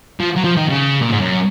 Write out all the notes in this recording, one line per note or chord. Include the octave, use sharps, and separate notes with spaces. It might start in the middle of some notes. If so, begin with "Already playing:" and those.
F3
F#3
F3
D#3
C#3
A#2
G#2
F#2